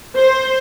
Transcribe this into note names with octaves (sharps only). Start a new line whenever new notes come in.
C5